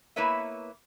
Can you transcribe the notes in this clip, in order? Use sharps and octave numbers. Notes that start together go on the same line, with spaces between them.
A#3 B3 E4 B4 C#5 E5